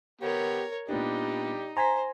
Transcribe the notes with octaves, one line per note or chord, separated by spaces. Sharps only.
B3 G4 A#4 C#5
A#2 B3 D4 D#4 G4 D5
C5 G#5 A#5 C6 B6